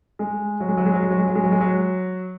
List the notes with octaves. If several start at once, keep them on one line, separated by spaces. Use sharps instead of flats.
G#3
F#3
G#3
F#3
G#3
F#3
G#3
F#3
G#3
F#3
G#3
F#3
G#3
F#3